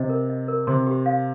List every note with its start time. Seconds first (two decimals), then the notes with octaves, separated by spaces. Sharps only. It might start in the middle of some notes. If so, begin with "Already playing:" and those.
Already playing: C3 D#5
0.09 A#4
0.29 D#5
0.48 A#4
0.67 C3 C6
0.87 G4
1.06 F5